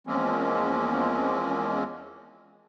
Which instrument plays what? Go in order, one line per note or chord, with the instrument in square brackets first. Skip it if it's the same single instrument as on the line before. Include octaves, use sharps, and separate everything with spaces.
[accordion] E2 F3 G#3 A#3 C4 C#4